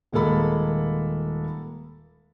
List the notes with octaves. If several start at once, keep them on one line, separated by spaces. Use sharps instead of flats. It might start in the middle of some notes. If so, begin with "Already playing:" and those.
D#1 G#3 A#3 A4 B5